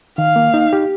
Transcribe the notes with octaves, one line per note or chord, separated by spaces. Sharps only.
D#3 F5
A#3
D#4
G4